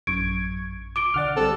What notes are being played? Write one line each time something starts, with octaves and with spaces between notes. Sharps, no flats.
A1 F#2 C#6 G#6 D7
D6 D7 G7
B1 D3 D5 F#5 F6 A6
G3 C4 A4